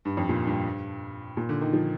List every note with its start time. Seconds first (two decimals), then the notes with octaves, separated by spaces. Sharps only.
0.05 G2
0.17 F2
0.29 A#2
0.47 G2
1.37 A#2
1.49 D3
1.61 D#3
1.73 F3